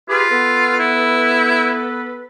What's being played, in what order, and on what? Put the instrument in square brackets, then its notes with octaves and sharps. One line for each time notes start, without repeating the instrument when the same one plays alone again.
[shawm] F4 [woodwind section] G4 G#4 B4
[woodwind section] B3 A4 B4
[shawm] E4